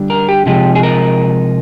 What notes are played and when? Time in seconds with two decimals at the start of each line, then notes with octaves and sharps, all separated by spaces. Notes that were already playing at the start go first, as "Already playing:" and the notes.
Already playing: D3 G3
0.10 A#4
0.29 G4
0.46 C3 F3 G#3 G4
0.75 G#4
0.83 A#4